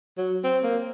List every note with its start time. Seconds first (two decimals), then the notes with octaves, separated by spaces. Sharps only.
0.18 F#3
0.44 C4
0.63 A#3